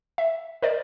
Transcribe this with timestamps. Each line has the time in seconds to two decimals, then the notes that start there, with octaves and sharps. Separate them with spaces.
0.18 E5
0.62 A#4 C5 D5 D#5